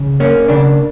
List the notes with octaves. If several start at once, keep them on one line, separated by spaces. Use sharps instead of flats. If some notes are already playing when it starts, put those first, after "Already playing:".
Already playing: C#3
A#3 C#4
C#3 D4